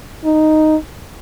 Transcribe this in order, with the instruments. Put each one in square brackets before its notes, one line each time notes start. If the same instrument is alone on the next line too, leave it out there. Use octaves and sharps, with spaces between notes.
[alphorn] D#4